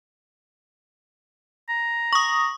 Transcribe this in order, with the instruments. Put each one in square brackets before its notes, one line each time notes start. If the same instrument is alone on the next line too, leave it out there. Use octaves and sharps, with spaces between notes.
[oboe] A#5
[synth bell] C#6 D#6